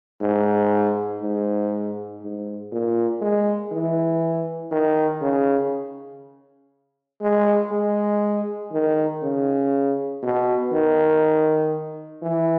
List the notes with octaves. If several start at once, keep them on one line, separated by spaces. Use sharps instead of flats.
G#2
G#2
G#2
A#2
G#3
E3
D#3
C#3
G#3
G#3
D#3
C#3
B2
D#3
E3